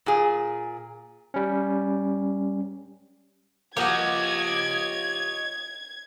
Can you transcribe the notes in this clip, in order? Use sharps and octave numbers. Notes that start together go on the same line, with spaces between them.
A#2 G#4
G3 C#4
F3 A#3 F#4 G4 C#5 D#5 G#6